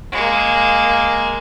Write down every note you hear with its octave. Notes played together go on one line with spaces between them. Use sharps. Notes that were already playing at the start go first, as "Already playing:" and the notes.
G#3 A#3